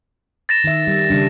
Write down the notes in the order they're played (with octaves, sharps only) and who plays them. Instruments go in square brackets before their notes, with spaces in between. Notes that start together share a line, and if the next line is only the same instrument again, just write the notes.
[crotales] A6 A#6 E7
[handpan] D#3 E5
G3
C#3 G3 D4